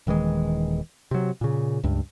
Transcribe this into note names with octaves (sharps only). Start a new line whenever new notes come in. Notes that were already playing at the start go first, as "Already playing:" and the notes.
D#1 D#3 E3 G#3
C3 F#3
A#2 C#3
C#2 G2